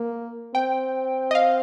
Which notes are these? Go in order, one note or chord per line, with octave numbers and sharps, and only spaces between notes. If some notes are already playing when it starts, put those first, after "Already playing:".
Already playing: A#3
C4 G5
D#5
F5